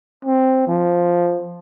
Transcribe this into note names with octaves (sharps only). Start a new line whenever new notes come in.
C4
F3